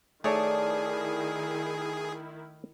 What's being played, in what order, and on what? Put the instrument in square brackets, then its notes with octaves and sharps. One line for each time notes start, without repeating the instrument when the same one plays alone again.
[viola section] D#3 E4 [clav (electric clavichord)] A3 C#5 [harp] D#4 D5 A5 [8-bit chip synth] G#4